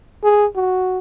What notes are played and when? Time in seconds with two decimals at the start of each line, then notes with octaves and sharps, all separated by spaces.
0.24 G#4
0.55 F#4